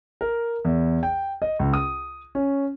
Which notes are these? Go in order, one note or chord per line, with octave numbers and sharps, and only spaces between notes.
A#4
E2
G5
D#5
C#2
D#6
C#4